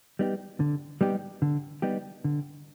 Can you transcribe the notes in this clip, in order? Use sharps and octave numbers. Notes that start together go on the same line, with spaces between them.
G3 B3 D#4 G4
D3
G3 B3 D#4 G4
D3
G3 B3 D#4 G4
D3